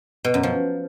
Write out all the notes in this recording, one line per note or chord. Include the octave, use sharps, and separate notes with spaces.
B2
F#2
F3